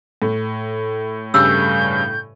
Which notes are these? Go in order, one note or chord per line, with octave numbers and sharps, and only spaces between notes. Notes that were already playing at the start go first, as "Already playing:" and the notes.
A2
G2 C#3 G3 G4 B4 E6 G6